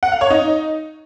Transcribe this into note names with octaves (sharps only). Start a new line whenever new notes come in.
F#5
F5
C#5
D#4